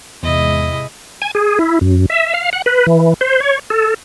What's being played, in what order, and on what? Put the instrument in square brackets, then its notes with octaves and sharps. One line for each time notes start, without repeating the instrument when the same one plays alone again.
[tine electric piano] E2 [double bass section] G#2 C3 G#3 [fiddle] E4 D#5
[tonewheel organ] G#5
G#4
E4
F#2
E5
F5
F#5
B4
E3
C5
C#5
A4